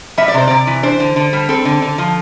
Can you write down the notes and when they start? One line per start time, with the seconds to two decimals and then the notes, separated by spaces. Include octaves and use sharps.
0.18 G3 E5
0.28 D5
0.34 C3 C5
0.47 C3 D5
0.67 E3
0.83 D4 C5
1.00 D3
1.16 D3
1.33 G3
1.49 C4 A4
1.65 D3
1.82 D3
1.98 F3